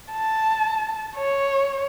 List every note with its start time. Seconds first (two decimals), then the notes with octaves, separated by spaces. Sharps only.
0.12 A5
1.17 C#5